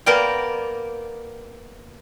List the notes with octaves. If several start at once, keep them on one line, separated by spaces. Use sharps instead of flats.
A#3 B3 A#4 D5 G5